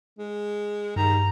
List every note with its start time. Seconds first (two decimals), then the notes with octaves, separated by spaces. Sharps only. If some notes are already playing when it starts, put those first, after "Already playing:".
0.19 G#3
0.96 G2 D#3 A#5